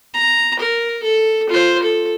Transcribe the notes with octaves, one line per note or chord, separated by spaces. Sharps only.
A#5
A#4
A4
F4 C5
A4